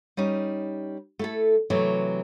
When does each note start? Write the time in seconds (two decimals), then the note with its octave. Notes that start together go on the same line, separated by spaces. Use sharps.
0.17 G3 C#4 D#4
1.19 A3 E4 A4
1.70 C3 E3 F#3 A3